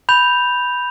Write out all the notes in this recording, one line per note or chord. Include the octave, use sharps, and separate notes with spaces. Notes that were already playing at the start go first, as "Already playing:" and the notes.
B5 G6 F7